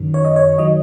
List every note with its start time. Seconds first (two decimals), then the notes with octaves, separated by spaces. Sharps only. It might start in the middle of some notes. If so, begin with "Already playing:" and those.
Already playing: F#2 D#3 F#3
0.14 C#5
0.25 D#5
0.36 C#5
0.58 D#3 F#3 D#5